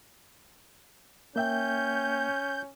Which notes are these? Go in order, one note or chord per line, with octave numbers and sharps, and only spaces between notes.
A#3 C#4 E5 G5 G6